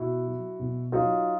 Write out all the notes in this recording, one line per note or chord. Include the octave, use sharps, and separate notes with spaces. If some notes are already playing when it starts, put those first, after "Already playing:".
Already playing: B2 E4 F#4
F#3
B2
F#3 D#4 F4